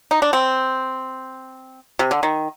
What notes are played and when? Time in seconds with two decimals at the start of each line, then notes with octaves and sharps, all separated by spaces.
0.11 D#4
0.22 D4
0.33 C4
1.99 C3
2.11 D3
2.23 D#3